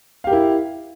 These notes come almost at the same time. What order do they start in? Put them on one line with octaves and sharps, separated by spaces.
F5 G4 A#4 E4